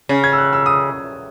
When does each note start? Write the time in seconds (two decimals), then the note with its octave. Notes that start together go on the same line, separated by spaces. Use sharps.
0.09 C#3
0.24 G#6
0.33 E6
0.38 F#6
0.53 E6
0.66 D#6